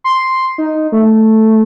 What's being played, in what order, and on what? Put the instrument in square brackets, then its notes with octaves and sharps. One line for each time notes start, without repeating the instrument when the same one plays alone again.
[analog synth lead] C6
D#4
A3